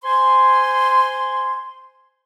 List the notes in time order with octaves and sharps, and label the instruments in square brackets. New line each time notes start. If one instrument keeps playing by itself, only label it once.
[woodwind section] C5 G#5 C6